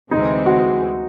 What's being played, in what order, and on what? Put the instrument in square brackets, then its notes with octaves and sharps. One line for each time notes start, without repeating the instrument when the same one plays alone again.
[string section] D2 C3 E3 G#3 C4 [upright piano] D#4
[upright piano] F#4